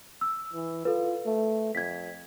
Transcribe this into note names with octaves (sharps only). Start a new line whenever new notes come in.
E6
E3
F4 A4 B4
A3
F2 G#6 B6